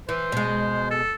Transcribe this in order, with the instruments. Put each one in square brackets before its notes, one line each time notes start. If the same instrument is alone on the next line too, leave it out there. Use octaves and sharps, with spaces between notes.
[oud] E3 [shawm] C5
[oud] B2 G#3
[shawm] A4